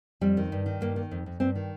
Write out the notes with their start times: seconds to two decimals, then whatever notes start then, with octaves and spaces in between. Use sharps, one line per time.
0.21 F2 G3
0.37 D#3
0.52 G2
0.66 D#3
0.81 G2 A#3
0.96 D#3
1.11 F2
1.26 F2
1.40 G2 C4
1.55 D#3